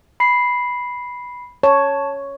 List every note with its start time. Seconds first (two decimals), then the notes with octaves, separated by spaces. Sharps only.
0.20 B5 C7
1.63 C#5 A5